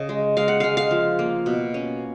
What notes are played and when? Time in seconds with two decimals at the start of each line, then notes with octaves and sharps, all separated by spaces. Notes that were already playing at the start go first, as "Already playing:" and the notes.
Already playing: C#3 D#5
0.09 G#3
0.37 G#3 F5
0.48 F#5
0.60 G#3 F5
0.77 F5
0.91 F3
1.19 A#3
1.46 B2
1.74 C#4